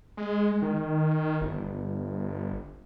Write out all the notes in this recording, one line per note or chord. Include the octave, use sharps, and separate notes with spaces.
G#3
D#3
G1